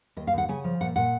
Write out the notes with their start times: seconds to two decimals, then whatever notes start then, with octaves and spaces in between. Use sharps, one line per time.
0.17 D#2 D#5
0.27 F5
0.33 D#2 F#5
0.49 C#3 G#5
0.64 F3
0.81 A#2 F#5
0.96 A#2 F#5